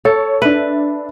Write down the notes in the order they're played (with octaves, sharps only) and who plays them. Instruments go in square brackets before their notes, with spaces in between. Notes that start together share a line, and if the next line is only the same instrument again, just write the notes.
[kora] A4 [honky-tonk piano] C#5
[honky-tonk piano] D4 E5 [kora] B4